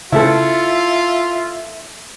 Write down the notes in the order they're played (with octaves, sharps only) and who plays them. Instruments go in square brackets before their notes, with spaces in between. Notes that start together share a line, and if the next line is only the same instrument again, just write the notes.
[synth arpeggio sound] C#3 A3 [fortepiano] E4 A4 [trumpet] F4 [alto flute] E5